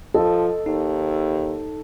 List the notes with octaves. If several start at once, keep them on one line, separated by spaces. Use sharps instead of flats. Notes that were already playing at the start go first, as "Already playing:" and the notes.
F3 A4 D#5
D#2 D#4